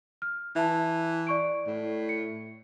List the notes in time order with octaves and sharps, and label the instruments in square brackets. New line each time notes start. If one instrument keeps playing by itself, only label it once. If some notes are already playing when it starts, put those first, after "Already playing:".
[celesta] F6
[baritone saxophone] E3 [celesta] E5 A5
[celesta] D5 C#6 D7
[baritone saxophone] A2
[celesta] C#7